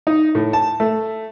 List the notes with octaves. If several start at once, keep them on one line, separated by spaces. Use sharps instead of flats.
D#4
A2
A5
A3